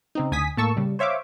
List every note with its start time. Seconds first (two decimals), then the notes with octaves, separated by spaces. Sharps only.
0.15 C#3 C4 D#4
0.32 D2 G#5 D#6 B6
0.57 A2 A#3 A5 C#6 E6
0.77 C#3 G3
0.99 C5 C#5 E5 F5 D6